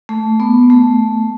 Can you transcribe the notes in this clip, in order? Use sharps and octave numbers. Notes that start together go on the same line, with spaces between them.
A3
B3
A3